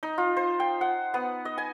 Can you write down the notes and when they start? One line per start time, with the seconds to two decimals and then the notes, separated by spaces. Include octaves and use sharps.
0.03 D#4
0.18 F4
0.37 C5
0.60 G5
0.81 F#5
1.14 B3
1.45 D#5
1.58 G#5